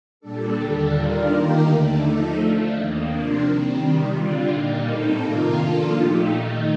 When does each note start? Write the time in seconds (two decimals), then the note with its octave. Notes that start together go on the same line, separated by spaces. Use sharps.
0.20 A#2 G3 D4 A4
0.56 D#2 D3 G3 D4 A4
0.91 D#3 G3 D4 F4 A#4
1.27 D#3 A#3 D#4 G4 A#4
1.63 D#2 D3 A3 D4
1.98 F3 A3 D#4 A4
2.35 F3 A3 D4
2.70 D#2 D#3 A#3
3.05 C3 F3 A#3 D4
3.41 D#3 G3 C4
3.77 C3 D#3 G3
4.12 D3 G3 D4 F4
4.48 A#2 G3 A#3 D#4
4.83 A2 G3 C4 D#4 A4
5.19 C3 D#3 A#3 F4 A#4
5.54 F3 A#3 D4 F4 A4
5.90 A#2 F3 A3 D#4 G4
6.26 D#3 A3 D#4